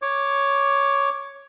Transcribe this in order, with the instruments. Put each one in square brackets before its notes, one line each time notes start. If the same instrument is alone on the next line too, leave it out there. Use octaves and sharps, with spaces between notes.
[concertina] C#5 D6